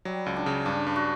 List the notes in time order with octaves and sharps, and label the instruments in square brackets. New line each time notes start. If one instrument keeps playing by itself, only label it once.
[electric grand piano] F#3 [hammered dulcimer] G3
[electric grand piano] C#2
[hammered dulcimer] D4
[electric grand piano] C#3
[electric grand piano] G2 [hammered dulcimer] D4
[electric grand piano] G2
[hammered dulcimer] F#4